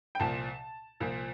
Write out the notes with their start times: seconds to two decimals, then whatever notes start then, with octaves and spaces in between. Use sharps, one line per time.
0.15 G5
0.20 C2 A#2 F3 A5
1.00 C2 A#2 F3